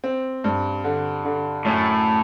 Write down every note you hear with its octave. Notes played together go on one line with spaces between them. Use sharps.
C4
G2
D3
D3
F#2 A2